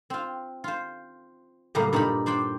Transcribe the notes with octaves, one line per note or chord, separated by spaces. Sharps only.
C4 F4
F4 C5
F#2 A2 C#3 G3 A#3
G2 A#2 D#4 A#4 D5 B5
D4 C5 D5 G5